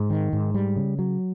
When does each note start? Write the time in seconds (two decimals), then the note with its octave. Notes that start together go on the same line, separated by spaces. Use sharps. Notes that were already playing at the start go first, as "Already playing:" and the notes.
Already playing: G#2
0.10 D#3
0.33 G#2
0.54 G3
0.76 C#3
0.99 F#3